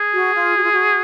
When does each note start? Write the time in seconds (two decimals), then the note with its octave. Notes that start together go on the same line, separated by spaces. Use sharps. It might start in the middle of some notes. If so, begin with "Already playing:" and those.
Already playing: G#4
0.13 F#4
0.35 F4
0.57 F#4
0.63 F4
0.72 F#4